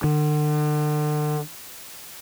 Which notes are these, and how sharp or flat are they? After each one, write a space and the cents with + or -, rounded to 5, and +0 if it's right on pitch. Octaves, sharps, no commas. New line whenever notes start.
D3 +40